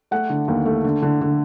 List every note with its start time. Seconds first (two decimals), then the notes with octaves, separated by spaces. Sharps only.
0.11 A3 F#5
0.30 D3
0.48 D#2
0.66 A3
0.84 D3
1.02 D3
1.21 D3